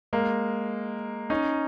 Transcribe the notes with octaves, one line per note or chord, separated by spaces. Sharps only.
G#3 A#3
C#4 D#4